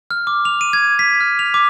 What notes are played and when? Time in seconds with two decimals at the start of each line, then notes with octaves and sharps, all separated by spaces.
0.11 F6
0.27 D6
0.45 F7
0.61 D#7
0.73 G#6
0.99 B6
1.20 F6
1.39 F7
1.54 D6